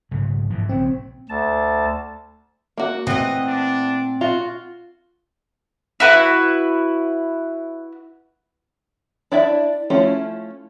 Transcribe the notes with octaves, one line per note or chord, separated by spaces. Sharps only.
B1 G#2 C#3
G#2 E3 F3
A#1 C#3 C4
D2 A5
A#3 F#4
A#2 E3 A3 C4 D#5 F#5
D4
F4 F#4
E4 F#4 B4
D4 E4 D5 E5
F3 A3 C#4 E4 F4